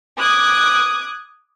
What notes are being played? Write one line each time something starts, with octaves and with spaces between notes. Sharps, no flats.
D6 D#6 F#6 G#6